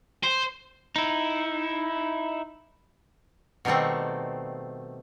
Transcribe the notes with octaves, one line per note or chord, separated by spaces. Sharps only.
C5
D#4 E4
B2 D#3 G3 A3 C4